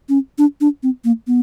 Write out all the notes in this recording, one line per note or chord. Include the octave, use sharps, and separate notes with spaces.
C#4
D4
D4
C4
A#3
B3